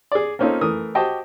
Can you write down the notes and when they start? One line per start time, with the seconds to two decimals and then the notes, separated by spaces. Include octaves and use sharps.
0.12 G#4 D5
0.39 A#3 C4 C#4 D#4 F4 A4
0.61 E3 A3 A#4 D#6
0.95 F#4 G4 C5 D#5 G5 A5